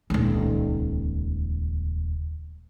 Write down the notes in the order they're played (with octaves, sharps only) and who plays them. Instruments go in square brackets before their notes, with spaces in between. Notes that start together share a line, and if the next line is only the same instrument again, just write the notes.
[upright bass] D#1 C#2